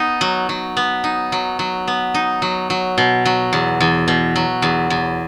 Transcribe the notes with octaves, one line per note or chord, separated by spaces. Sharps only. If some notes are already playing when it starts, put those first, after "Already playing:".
Already playing: B3 D#4
F#3
F#3
B3
D#4
F#3
F#3
B3
D#4
F#3
F#3
B2
F#3
E2
E2
B2
F#3
E2
E2